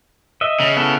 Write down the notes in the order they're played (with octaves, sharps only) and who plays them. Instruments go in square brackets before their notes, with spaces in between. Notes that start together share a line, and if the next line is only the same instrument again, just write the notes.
[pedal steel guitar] D#5 E5
[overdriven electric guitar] C#3
[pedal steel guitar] B3 E4 A4